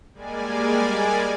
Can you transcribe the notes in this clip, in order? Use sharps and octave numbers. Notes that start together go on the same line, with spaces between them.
G3 G#3 A#3 D5 G#5